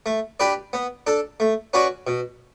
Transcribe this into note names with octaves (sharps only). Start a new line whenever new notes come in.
A3
D4 G4 B4 D5
B3
D4 A4
A3
C#4 F#4 B4 D5
B2